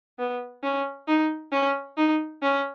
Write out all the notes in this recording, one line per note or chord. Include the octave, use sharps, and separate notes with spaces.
B3
C#4
D#4
C#4
D#4
C#4